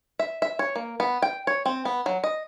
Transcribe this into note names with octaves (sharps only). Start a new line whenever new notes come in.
E5
E5
C#5
A#3
B3
G5
C#5
C4
B3
F#3
D#5